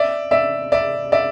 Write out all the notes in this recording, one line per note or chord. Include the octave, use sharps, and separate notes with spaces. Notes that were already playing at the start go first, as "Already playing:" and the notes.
Already playing: D5 E5
D5 E5
D5 E5
D5 E5